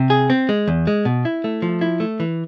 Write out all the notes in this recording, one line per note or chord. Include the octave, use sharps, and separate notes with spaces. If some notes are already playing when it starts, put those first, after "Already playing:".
Already playing: C3
G#4
C4
G#3
E2
G#3
B2
E4
A3
F3
E4
A3
E3